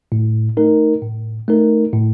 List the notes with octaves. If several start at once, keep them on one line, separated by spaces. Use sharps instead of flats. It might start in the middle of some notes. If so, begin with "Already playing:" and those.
A2
A3 D#4 A#4
A2
A3 D#4 A#4
A2